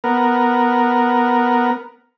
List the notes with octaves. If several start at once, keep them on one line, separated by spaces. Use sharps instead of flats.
B3 A#4